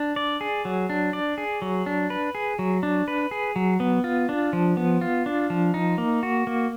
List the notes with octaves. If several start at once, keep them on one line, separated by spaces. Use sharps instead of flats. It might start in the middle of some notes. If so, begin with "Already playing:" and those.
Already playing: D4
D5
G#4
F#3
D4
D5
G#4
F#3
D4
B4
G#4
F#3
D4
B4
G#4
F#3
B3
F4
D4
F3
B3
F4
D4
F3
D#4
A#3
F#4
A#3